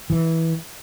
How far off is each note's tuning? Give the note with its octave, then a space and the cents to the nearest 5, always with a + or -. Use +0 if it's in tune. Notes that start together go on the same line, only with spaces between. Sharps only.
E3 -10